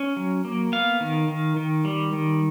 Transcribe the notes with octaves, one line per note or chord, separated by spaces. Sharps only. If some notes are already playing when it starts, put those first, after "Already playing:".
Already playing: C#4
F#3
A#3
B3 F5
D#3
D#3
D#3
G3
D#3